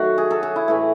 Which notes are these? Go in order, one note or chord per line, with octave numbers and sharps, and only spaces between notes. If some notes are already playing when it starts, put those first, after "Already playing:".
Already playing: D#3 F#3 A3 F#4
G#4
A4
G#4
E4
A2 E3 A3